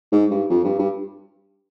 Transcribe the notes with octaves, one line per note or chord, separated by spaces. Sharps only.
G#2
G2
F2
G2
G2